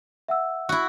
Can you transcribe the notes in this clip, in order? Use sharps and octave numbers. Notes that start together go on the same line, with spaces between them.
E5 F#5 E6
E4 F#4